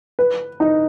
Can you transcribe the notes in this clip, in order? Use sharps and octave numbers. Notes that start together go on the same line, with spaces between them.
B4
D#4